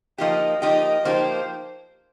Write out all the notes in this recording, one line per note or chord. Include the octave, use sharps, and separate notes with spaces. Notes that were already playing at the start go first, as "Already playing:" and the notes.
F3 A#3 D#4 G4 D#5
F3 A#3 D#4 G4 D#5
F3 A#3 D#4 G4 C5